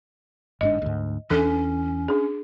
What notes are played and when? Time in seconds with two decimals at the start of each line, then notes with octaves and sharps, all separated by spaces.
0.61 G1 G#2 D4 D#5
0.82 D2 G#2
1.30 E2 E3 C#4 D4 A4
2.08 D4 G#4